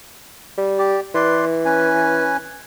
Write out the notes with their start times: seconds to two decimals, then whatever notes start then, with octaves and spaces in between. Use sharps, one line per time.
0.58 G3
0.78 G4 D5
1.15 E3 B4 D5 C6
1.65 C#4 B4 G#5